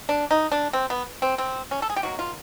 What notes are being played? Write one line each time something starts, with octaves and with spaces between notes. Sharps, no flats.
D4
D#4
D4
C4
B3
C4
C4
C#4
A4
G#4
G4
D#3 F#3 A#3 F#4
F4